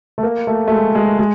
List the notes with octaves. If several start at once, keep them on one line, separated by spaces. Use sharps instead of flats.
A3
A#3
A3
A3
G#3
G#3
G#3